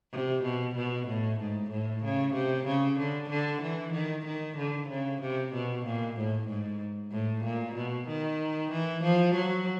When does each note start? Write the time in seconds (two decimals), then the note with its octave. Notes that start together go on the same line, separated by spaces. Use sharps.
0.12 C3
0.44 B2
0.76 B2
1.08 A2
1.40 G#2
1.71 A2
2.04 C#3
2.34 C3
2.67 C#3
2.99 D3
3.30 D3
3.62 E3
3.93 D#3
4.26 D#3
4.57 D3
4.89 C#3
5.22 C3
5.54 B2
5.85 A#2
6.17 A2
6.49 G#2
7.12 A2
7.44 A#2
7.75 B2
8.08 D#3
8.72 E3
9.03 F3
9.35 F#3